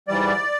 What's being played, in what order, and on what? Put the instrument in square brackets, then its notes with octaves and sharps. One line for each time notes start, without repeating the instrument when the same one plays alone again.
[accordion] G#2 E3 G3 D5